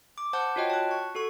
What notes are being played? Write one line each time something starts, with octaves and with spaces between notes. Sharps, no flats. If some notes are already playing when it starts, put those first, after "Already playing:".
D6
C5 F#5 A5 G6
F4 F#4 C#5 D#5 G5
A5 F#6
C#6
F#4 A4 C#6